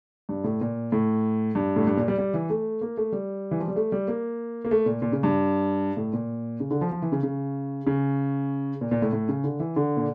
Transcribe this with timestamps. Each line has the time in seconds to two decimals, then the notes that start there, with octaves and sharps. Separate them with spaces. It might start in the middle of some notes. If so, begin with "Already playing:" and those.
0.29 G2
0.44 A2
0.61 A#2
0.92 A2
1.55 G2
1.76 A2
1.87 G2
1.97 A#2
2.08 G3
2.18 G3
2.34 E3
2.50 A3
2.81 A#3
2.97 A3
3.12 G3
3.51 E3
3.60 F3
3.68 G3
3.76 A3
3.92 G3
4.08 A#3
4.65 A#3
4.71 A3
4.86 A#2
5.02 A#2
5.12 C#3
5.23 G2
5.97 A2
6.13 A#2
6.60 C#3
6.71 D3
6.81 F3
6.92 F3
7.02 E3
7.12 C#3
7.23 C#3
7.87 C#3
8.81 A#2
8.91 A#2
9.02 A2
9.13 A2
9.29 C#3
9.44 D3
9.60 E3
9.76 D3
9.97 A#2